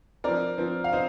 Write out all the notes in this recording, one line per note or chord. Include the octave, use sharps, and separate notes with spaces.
F3 C4 A#4 D5
F3 C4
F5
C4 C5 D#5